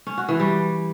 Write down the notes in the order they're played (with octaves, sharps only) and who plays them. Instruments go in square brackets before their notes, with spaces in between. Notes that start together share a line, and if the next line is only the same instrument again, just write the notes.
[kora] C#4
F#4
E3
G3